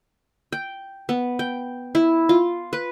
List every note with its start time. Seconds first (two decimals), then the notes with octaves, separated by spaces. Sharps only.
0.52 G5
1.09 B3
1.39 G5
1.95 E4
2.29 F4
2.73 B4